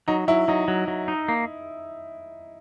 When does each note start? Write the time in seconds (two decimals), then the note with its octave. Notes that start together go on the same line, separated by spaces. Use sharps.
0.08 F#3 D#4
0.28 F#3 E4
0.48 F#3 D#4
0.68 F#3
0.88 F#3
1.08 D#4
1.28 A#3